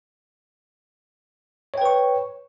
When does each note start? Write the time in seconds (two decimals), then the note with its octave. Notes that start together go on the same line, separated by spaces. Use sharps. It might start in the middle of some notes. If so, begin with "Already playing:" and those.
1.74 C#5
1.78 G5
1.82 B4
1.85 C#6